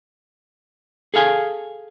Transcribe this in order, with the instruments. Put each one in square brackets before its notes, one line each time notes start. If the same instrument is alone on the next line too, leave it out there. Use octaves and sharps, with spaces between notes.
[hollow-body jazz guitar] G#4 A4 F5 G#5